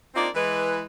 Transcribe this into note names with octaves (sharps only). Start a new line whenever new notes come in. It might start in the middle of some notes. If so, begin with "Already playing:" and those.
A#3 C4 D4 D#4 F4 D5
E3 G#3 B4